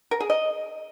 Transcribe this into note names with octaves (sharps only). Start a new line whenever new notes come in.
A#4
G#4
D#5